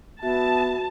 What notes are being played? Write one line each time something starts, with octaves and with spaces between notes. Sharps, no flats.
B3 F#4 E5 A5